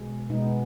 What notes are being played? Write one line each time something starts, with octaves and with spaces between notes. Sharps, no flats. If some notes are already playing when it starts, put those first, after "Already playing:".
Already playing: B2 G#3
B2 G#3 B3 D#4